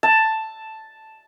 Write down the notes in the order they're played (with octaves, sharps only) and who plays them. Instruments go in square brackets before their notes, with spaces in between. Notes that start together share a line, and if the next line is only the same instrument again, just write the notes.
[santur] A5